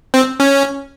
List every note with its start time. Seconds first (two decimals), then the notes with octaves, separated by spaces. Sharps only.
0.14 C4
0.40 C#4